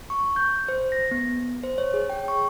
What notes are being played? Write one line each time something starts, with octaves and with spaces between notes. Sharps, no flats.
C#6
G6
C5
A#6
B3
C5
C#5
G#4
G5
C#6